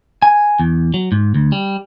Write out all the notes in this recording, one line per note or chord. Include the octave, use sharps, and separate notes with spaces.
G#5
E2
F#3
G#2
D2
G3